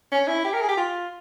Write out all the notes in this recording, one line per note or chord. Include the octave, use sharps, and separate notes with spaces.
C#4
E4
G4
A#4
G#4
G4
F4